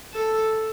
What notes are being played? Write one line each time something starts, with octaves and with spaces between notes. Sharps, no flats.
A4